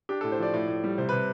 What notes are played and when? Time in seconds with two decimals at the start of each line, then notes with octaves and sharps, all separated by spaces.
0.09 D4 G4
0.21 A4
0.24 A2
0.32 C5
0.39 F3 D5
0.53 A2 D5
0.68 A2
0.84 G3
0.98 C3 C5
1.09 C3 B4